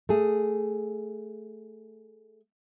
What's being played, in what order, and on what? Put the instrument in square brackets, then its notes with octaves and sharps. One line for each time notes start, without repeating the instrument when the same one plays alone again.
[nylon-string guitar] A3 G#4